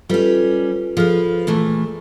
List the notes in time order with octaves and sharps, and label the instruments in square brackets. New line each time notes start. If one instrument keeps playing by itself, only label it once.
[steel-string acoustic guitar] G3 C#4 [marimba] F4 A4 B4
[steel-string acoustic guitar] F3 B4 [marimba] G#4 A4 F6
[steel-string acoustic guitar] A#2 E3 A3